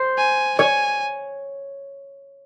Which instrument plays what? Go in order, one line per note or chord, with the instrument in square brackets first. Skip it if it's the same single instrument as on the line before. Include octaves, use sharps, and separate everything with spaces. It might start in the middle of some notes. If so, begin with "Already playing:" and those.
Already playing: [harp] C5
[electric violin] G#5
[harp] C#5 [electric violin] G#5